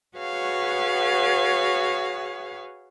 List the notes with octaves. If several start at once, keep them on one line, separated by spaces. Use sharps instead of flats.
F#4 G#4 B4 C#5 F5 F#5